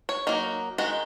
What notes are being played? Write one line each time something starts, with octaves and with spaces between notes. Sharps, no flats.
C#5
F#3 A#3 D#4
D#3 G#3 D#4 F#4